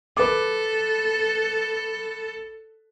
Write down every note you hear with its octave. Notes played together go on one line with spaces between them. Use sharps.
A4 B4 D6